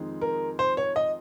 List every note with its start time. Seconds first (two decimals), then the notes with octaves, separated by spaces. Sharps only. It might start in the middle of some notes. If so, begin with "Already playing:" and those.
Already playing: F2 D#3 G#3 C4 D#4
0.21 A#4
0.59 C5
0.77 C#5
0.96 D#5